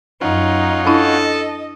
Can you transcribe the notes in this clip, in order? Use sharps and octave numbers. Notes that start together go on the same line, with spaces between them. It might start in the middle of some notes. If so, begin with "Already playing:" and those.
F#2 C#4 D#4 F4 F#5
D4 E4 A4 D#5